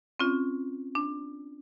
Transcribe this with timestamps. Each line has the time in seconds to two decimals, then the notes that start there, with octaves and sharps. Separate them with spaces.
0.19 C4 C#4 F4
0.95 D4